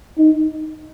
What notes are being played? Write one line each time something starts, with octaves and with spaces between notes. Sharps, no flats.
D#4